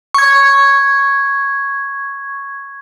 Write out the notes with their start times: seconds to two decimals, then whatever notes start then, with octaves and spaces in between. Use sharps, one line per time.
0.14 C#6 G#6